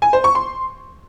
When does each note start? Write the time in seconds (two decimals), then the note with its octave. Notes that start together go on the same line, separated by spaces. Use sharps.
0.02 G#5
0.13 C5
0.24 C#6
0.35 C6